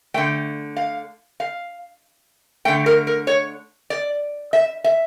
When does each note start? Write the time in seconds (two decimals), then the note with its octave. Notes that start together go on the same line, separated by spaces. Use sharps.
0.14 D3 A3 G5
0.77 F5
1.40 F5
2.65 D3 A3 G5
2.86 A#4
3.07 A#4
3.27 C#5
3.90 D5
4.53 E5
4.84 E5